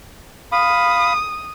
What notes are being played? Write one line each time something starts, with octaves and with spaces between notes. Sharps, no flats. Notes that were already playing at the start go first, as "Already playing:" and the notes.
F5 B5 D#6